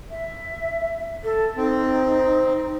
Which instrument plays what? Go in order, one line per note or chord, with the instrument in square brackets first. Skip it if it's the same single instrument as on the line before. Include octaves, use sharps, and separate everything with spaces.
[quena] E5
A4
[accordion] C4 [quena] D#4